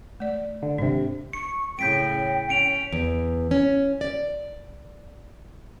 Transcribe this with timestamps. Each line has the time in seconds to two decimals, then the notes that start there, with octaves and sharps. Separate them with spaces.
0.20 A3 D5
0.63 D3
0.78 G#1 C3 D4
1.33 C#6 C#7
1.79 A2 C#3 G5 G6 B6 D7
2.49 C#4 C#7 D7 F7
2.92 E2
3.51 C#4
4.01 D5